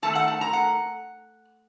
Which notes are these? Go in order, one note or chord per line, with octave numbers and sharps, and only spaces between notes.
D#3 A3 C4 A5
F#5
A5
A#5
F#5